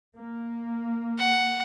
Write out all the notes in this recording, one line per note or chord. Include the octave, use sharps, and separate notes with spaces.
A#3
F#5